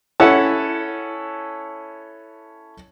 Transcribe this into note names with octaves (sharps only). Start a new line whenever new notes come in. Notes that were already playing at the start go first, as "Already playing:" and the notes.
C#4 E4 A4 F#5 A5